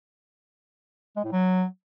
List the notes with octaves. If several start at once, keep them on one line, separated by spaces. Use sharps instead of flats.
G#3
A2
F#3